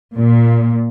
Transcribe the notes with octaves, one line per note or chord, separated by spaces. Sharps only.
A#2